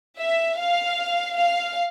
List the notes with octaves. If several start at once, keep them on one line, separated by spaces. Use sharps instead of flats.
E5
F5
F5